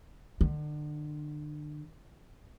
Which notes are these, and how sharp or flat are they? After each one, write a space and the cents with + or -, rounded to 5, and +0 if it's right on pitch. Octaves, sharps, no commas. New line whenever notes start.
D3 +35